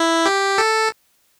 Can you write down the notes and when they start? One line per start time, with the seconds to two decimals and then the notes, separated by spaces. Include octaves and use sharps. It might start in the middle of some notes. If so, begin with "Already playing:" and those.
Already playing: E4
0.26 G4
0.58 A4